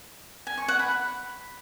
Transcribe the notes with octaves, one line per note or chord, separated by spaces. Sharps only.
G#5
C#6
F#5
B5